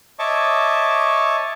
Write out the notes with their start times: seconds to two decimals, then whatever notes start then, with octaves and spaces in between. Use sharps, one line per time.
0.19 C#5 D#5 E5 A5 C#6 D6